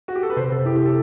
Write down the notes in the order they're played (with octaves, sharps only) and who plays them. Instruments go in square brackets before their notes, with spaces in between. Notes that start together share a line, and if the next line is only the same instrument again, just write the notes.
[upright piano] F#4
G4
A4
B4
[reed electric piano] C3 [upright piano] C5
[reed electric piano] C3 [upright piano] A4
[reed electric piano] E4 [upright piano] G4
[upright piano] G4
A4